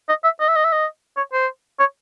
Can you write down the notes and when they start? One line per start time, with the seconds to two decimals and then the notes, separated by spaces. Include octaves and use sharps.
0.09 D#5
0.24 E5
0.40 D#5
0.48 E5
0.56 D#5
0.64 E5
0.73 D#5
1.17 C#5
1.33 C5
1.80 C#5